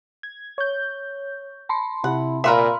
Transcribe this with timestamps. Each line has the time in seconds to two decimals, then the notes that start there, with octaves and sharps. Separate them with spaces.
0.23 G#6
0.58 C#5 G6
1.69 A5 B5 C6
2.04 C3 E4 F#5
2.44 A#2 A#4 B4 E5 F5 C6 F6